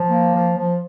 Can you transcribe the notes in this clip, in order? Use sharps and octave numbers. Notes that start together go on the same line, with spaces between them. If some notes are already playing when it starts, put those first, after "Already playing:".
Already playing: F3
A#3
F3
F3